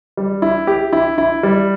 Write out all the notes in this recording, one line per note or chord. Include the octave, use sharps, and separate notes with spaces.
G3
E4
G4
E4
E4
G3